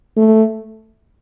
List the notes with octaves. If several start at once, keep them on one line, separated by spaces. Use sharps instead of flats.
A3